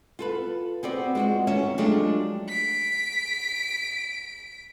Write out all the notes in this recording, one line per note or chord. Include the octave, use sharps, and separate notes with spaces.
F4 A4 B4
B3 C4 F#4 D5
G#3 F4 F#4
D#3 C#4 C#5 E5
F3 F#3 G#3 A3 D4 G4
B6 D7